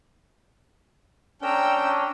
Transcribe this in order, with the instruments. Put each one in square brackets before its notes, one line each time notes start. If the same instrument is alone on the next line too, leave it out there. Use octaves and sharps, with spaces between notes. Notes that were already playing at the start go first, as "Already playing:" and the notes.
[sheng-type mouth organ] C#4 D4 [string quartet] G5 A#5 E6